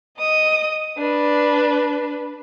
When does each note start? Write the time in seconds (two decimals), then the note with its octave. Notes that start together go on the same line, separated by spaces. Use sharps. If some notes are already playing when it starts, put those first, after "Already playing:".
0.18 D#5 D#6
0.98 D4 B4